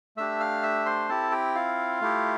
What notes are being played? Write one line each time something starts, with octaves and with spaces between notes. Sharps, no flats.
A3 D4 G4 E5 E6
F5 F6
E5 E6
C5 C6
C4 E4 G4 A4 A5
G4 G5
F4 F5
A3 E4 G4